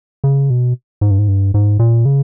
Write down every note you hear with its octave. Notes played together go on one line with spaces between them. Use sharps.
C#3
B2
G#2
G2
G#2
G2
G#2
A#2
C#3